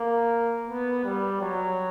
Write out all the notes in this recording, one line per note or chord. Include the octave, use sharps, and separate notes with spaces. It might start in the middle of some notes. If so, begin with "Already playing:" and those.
Already playing: A#3
B3
G3
F#3